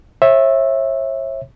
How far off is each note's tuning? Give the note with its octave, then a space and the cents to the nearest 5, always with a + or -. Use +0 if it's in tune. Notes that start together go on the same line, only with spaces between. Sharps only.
C#5 -40 E5 +0